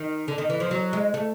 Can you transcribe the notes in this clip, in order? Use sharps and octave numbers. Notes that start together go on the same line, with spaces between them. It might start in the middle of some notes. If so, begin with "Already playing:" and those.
Already playing: D#3
D3
D#3
E3
F3
F#3
G#3
A3